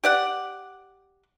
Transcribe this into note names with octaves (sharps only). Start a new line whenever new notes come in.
G4 D5 F#5